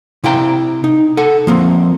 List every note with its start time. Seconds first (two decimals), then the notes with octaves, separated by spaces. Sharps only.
0.24 C3 E4 F5 G5 A#5
0.84 D#4
1.17 A4 F#5
1.47 F3 A#3 C4